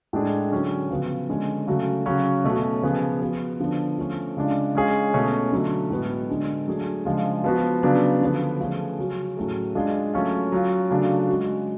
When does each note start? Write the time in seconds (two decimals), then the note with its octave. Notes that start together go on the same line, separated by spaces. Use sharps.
0.13 A2 G#3 D4 G#4
0.52 D3 F#3 C#4
0.90 C#3 F3 B3 F#4
1.29 D3 G#3 C#4 G#4
1.67 C#3 F#3 A3 C#4 F#4
2.06 C#3 F#3 C#4 F#4
2.44 B2 A3 C#4 F#4
2.82 C#3 F3 B3 F4 G#4
3.21 F3 B3 F#4
3.60 D3 F3 B3 D4
3.98 F3 A3 C#4
4.37 C#3 G#3 D4 F4
4.75 G#3 C#4 F4 G#4
5.13 B2 A3 C#4 F4
5.52 D3 F#3 A3
5.90 A2 G#3 B3 F#4
6.29 D3 G#3 D4
6.67 F#3 A3 D4 G#4
7.05 C#3 F3 G#3 D4 F4
7.44 F3 B3 F#4
7.83 C#3 F#3 B3 D4 F4
8.22 D3 F3 B3
8.60 F3 A3 C#4 G#4
8.99 C#3 F#3 C#4 F#4
9.37 A2 F#3 A3 C#4 G#4
9.75 G#3 D4 F4 G#4
10.14 F#3 A3 C#4 F4
10.52 F#3 C#4 F4
10.90 C#3 F#3 A3 D4 F4
11.29 G#3 C#4 F#4